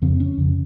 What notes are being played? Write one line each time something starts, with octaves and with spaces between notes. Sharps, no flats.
F2 C#3 C4
C#4
F2 C#3